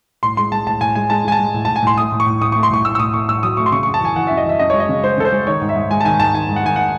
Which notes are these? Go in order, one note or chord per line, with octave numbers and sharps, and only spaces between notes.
A2 C6
G#3 C6
G#3 A5
A2 A5
A2 G#5
G#3 G#5
G#3 A5
G#3 G#5
A5
G#3
A2
A5
A2
G#5
A2 C6
A3 D#6
A2
C#6
A2
A2 D#6
C#6
A3
C6
A2 C#6
A2 E6
E6
A2 D#6
A3 C#6
A2 E6
F#3 D#6
A3 C#6
C6
C#3 C#6
C#6
F#2
A5
E3 G#5
E3 F#5
E5
F#2
D#5
E3 E5
F#2 D#5
G#3 C#5
D#5
C#3
G#3 C5
C#3 A4
C5
G#3
D#3 C#5
G#2
E5
G#2
G#3 G#5
A5
D#3 G#5
G#2 A5
D#3 G#5
G#2
F#5
D#3 G#5
F#5